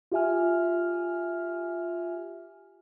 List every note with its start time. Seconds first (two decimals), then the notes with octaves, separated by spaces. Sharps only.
0.11 F4 G4 E5 G#5 F6